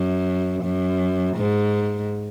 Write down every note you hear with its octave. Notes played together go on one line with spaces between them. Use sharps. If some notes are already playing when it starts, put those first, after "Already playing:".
Already playing: F#2
F#2
G#2